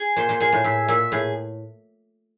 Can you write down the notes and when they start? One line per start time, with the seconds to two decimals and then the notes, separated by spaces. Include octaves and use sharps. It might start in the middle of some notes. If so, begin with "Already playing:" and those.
Already playing: G#4
0.16 A#2 C5
0.29 A#2
0.40 A#2 G#4
0.53 A2
0.64 A2 E5
0.88 A#2 E5
1.12 A2 G#4